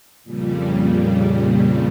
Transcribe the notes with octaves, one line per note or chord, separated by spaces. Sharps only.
F2 A#2 C#3 G3